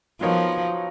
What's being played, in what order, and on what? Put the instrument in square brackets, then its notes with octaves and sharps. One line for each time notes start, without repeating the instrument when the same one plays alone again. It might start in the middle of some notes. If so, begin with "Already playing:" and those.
[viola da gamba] F3 [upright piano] F#3 B3 D#4 A#4 C#5